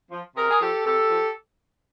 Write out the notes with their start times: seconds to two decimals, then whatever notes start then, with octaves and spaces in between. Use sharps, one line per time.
0.11 F3
0.36 C3 G#4 A#4
0.50 G#4
0.60 F3 G4 A4
0.85 C3 G4 A4
1.10 F3